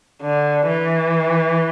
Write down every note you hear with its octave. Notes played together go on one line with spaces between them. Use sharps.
D3
E3